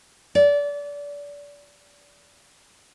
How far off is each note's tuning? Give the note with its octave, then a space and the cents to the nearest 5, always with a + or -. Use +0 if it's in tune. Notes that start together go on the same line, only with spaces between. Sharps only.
D5 -25